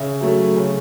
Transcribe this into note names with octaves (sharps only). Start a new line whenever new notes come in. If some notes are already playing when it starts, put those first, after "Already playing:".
Already playing: C#3 E5
F#3 A3
C#3